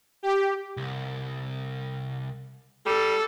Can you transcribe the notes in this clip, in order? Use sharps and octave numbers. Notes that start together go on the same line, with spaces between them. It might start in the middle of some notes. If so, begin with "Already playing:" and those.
G4
C2
G3 A4